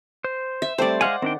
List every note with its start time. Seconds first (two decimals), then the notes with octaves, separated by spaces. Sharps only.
0.24 C5
0.62 E5
0.78 G3 A3 C4 C5 D5
1.01 G#3 F5 F#5 G#5
1.22 D#3 C4 D4 G5